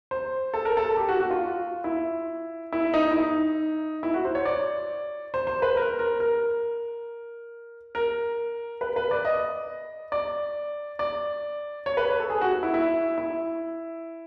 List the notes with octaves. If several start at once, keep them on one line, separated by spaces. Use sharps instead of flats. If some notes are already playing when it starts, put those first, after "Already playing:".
C5
A4
A#4
A4
G4
F#4
F#4
F4
E4
E4
D#4
E4
D#4
E4
F#4
C5
C#5
D5
C5
C5
B4
A#4
A#4
A#4
A#4
B4
B4
D5
D#5
D5
D5
C#5
B4
A4
G#4
F#4
E4
E4
E4